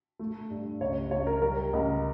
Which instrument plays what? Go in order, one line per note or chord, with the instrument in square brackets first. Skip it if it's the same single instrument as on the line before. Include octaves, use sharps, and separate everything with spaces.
[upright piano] A3
G2
C#2 C#5
C#2 C#5
A#4
G3 A#4
C#2